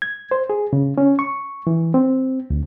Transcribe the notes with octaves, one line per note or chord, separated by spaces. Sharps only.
G#6
C5
G#4
C#3
C#4
C#6
E3
C4
D2